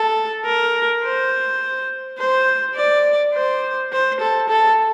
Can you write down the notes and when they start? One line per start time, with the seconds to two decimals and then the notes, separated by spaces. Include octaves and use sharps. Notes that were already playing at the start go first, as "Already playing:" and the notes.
Already playing: A4
0.45 A#4
1.03 C5
2.18 C5
2.76 D5
3.34 C5
3.92 C5
4.20 A4
4.49 A4